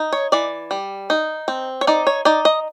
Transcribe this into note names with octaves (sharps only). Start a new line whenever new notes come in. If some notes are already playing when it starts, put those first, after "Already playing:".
Already playing: D#4
C#5
E3 D5
G3
D#4
C4
C#5
D#4 D5
C#5
D#4 D5
D#5